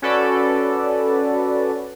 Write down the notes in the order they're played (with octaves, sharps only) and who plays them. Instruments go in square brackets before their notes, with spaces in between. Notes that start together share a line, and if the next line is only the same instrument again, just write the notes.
[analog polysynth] C#4 F#4 A4 B4 D5